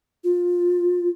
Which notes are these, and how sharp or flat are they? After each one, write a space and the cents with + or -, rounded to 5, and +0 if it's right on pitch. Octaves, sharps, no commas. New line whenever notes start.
F4 +20